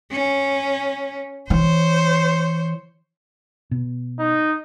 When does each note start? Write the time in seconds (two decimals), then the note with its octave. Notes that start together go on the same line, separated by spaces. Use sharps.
0.12 C#4
1.50 E3 C5 C#5
3.71 B2
4.19 D#4